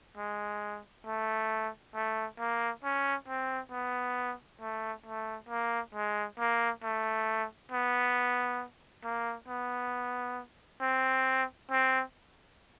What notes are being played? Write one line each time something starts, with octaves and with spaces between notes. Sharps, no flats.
G#3
A3
A3
A#3
C#4
C4
B3
A3
A3
A#3
G#3
A#3
A3
B3
A#3
B3
C4
C4